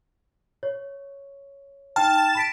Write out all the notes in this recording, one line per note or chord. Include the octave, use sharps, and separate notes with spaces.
C#5
D#4 G5 A5 F6
B5 B6 D7